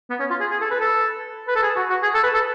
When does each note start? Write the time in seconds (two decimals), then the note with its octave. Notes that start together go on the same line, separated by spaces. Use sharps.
0.10 B3
0.19 C#4
0.30 F4
0.40 G#4
0.51 G#4
0.61 A4
0.71 B4
0.80 A4
1.47 B4
1.55 A4
1.63 G#4
1.76 F#4
1.90 F#4
2.03 G#4
2.14 A4
2.23 B4
2.34 A4